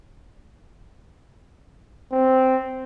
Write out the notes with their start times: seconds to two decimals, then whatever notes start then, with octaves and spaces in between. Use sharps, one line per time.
2.12 C4